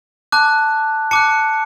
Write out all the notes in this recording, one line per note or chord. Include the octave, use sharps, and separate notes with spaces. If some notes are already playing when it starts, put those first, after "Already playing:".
A5 D6 F#6
A5 D6 F#6 C#7